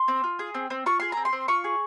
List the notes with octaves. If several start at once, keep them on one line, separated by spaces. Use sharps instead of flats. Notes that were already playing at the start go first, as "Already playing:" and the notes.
Already playing: C6
C4
F4
G#4
C4
C4
F4 C#6
G#4 C6
C4 A#5
C6
C4
F4 C#6
G#4